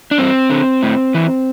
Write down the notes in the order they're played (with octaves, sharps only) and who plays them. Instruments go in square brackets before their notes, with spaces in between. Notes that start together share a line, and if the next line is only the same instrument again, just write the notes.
[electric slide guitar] D4
G2 C4
D3
A2
E3